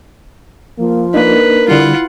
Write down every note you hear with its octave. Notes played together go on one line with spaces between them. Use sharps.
F3 A#3
A#3 D4 D#4 A#4 B4
D3 G3 E4 F4 F#5